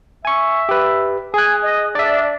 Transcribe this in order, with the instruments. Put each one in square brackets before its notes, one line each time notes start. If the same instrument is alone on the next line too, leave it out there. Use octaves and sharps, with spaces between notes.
[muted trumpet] E5 [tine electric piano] G#5 C#6
[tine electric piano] G4 B4
[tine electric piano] G#4 F#6 [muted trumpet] G#5
[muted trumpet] D#5
[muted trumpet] D4 [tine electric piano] D5 E5